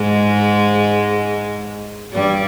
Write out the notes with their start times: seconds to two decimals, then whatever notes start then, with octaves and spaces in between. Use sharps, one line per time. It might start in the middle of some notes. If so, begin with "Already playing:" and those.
Already playing: G#2 G#3
2.12 G2 G3